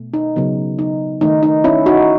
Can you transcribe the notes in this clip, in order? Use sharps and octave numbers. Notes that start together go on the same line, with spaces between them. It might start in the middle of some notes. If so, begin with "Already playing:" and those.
Already playing: B2 A3
D#4
C#3 F#3 B3
D#4
D#3 A3 D#4
D#4
C#4 E4
D#4 F#4